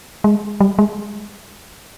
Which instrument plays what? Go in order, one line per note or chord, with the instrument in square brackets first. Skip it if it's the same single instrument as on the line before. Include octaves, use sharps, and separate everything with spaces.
[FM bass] G#3
G3
G#3